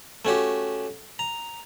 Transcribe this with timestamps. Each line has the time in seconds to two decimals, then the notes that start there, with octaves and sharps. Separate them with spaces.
0.25 A3 C#4 F#4 G4
1.19 A#5